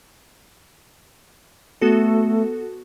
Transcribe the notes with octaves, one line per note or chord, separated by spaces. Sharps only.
A3 B3 F#4 A4